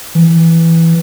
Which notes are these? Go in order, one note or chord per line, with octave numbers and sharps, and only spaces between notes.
E3